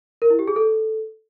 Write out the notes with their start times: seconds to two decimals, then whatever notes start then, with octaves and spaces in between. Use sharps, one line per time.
0.22 A#4
0.30 E4
0.39 G4
0.48 G#4
0.56 A4